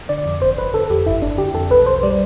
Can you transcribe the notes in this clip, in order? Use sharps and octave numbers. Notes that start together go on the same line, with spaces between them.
D3 D5
F2
G1 C5
G1 B4
D3 A4
F2 G4
G1 E4
G1 D4
D3 G4
F2 A4
B1 B4
B1 C5
G3 D5